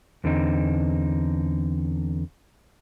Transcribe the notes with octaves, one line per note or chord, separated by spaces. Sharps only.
E2 D3 C4 D#4